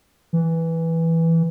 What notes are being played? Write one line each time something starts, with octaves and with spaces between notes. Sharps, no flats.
E3